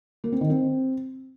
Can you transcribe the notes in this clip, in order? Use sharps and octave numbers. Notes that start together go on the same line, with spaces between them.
A#3
C4
D#3
C4